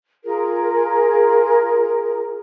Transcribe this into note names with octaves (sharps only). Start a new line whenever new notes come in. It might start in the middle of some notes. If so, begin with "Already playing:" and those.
F4 G#4 A#4